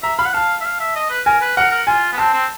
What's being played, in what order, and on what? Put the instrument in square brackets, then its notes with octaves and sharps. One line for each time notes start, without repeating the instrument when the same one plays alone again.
[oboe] E5 [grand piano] A#5
[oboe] F5 [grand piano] B5
[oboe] F#5
[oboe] F5 [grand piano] A5
[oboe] E5
F5
E5
D#5
B4
[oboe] A#4 [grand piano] G#5
[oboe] B4
[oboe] A#4 [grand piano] F#5
[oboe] A#4
[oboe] F4 [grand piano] G#5
[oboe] B3
[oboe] C4 [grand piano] A5
[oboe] C4